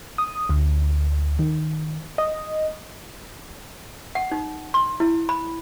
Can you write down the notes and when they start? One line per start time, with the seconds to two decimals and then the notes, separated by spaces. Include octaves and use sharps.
0.18 D#6
0.49 D2
1.39 D#3
2.18 D#5
4.15 F#5
4.32 D#4
4.74 C6
5.00 E4
5.29 B5